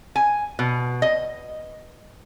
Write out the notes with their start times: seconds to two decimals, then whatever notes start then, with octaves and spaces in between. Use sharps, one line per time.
0.16 G#5
0.59 B2
1.02 D#5